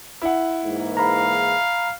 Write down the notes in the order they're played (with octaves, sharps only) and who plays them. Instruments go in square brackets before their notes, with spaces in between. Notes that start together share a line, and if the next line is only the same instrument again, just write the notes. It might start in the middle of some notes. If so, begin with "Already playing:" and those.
[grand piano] E4 F#5
[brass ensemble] G#2 E3 A#3
[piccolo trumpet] F5 [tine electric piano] A#5 B5